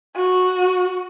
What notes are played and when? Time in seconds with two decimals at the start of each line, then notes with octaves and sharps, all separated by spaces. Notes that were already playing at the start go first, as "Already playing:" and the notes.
0.16 F#4